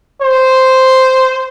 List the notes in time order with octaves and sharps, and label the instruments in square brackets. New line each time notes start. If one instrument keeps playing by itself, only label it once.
[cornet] C5